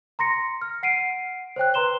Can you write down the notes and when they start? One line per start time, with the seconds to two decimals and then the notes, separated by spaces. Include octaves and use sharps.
0.19 A#5 C6 A#6 C#7
0.62 F6
0.83 F#5 C7 D7 D#7
1.56 C5 C#5 G5 F#6
1.74 B4 A#5 C6 E7 G7